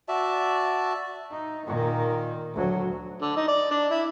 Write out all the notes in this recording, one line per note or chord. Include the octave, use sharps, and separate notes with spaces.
F#4 D5 E5 A5
D#4
A#2 D#3
D2 F#3
D3
D#4
D5
D4
E4